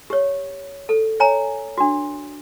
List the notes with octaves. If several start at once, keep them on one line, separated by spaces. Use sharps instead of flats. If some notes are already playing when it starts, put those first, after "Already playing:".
G4 C#5
A4
C#5 G#5 A#5
D4 F#4